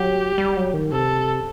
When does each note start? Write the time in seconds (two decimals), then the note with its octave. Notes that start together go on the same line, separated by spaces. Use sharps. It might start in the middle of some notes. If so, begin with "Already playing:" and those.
Already playing: F#3 G4
0.38 G3
0.57 F#3
0.74 D#3
0.92 C3 A4